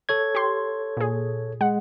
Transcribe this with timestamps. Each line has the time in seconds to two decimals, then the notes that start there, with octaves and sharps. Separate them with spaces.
0.09 A4 C#5 G#6
0.35 G4 C6
0.97 A#2 G#4
1.61 G#3 F#5